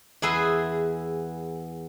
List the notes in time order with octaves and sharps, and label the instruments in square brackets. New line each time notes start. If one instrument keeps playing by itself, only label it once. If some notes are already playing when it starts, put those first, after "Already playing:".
[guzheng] E2 G#4 B4 E5 G#5 C6